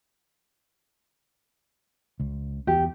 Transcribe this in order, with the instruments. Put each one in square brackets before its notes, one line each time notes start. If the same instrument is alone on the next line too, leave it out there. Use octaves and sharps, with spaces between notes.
[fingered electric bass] C#2
[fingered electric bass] E2 [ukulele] G4